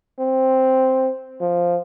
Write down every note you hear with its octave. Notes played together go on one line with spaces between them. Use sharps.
C4
F3